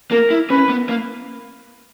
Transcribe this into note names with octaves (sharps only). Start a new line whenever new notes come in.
A#3 A#4
E4
C#4 B4
B3
A#3